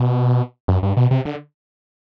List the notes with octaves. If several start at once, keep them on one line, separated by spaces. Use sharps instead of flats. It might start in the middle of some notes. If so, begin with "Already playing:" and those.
Already playing: B2
F#2
G2
B2
C3
D3